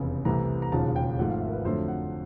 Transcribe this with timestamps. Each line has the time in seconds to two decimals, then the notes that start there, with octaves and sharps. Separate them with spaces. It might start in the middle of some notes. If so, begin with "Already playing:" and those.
Already playing: F1 E2 C#3
0.25 C2 C3 E3 A3 A#5
0.62 A#5
0.72 E1 D#2 C#3 F3 A5
0.96 G5
1.18 G#1 G#2 F3 A3 F#5
1.30 F5
1.42 E5
1.47 A#4
1.53 B4
1.65 F2 D3 F#3 A3 C5
1.88 F#5